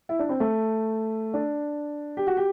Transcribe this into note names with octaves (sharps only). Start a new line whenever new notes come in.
E4
D4
C4
A3
D4
G4
F#4
G4